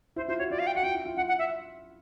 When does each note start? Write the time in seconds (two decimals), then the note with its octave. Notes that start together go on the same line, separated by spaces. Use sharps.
0.16 E4 C5
0.28 F4 C5
0.39 F#4 C#5
0.50 F4 D5
0.59 F5
0.67 G5
0.75 F#4 F#5
0.83 F4 G5
0.94 E4
1.05 F4
1.17 F4 F#5
1.28 F#5
1.39 E5